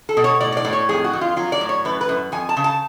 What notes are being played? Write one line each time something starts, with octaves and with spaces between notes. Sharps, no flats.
A4
B2
C#5
A2 D5
C#5
D5
A2
C#5
F2 G#4
F#4
F2
F4
F#3 F4
D5
A2
C#5
F#2 B4
B4
F#2
F2 G#5
A5
C#3
A5